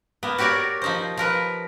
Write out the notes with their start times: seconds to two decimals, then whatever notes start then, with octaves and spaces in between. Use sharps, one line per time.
0.23 A#3 B3
0.38 F#4 G4 A#4 C#5 D5
0.82 F3 D#4 C5
1.17 F3 A#4 B4